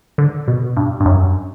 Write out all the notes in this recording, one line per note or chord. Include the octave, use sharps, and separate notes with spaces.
D3
B2
G2
G2
F#2